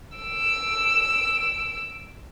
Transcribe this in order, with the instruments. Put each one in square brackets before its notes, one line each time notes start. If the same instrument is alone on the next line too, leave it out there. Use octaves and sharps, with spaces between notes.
[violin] E6 D7